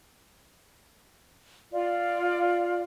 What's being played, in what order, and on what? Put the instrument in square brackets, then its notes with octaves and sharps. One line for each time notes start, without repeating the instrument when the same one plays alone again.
[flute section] F4 D5